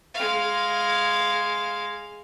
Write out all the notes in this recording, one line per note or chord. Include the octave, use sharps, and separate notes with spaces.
G#3 F5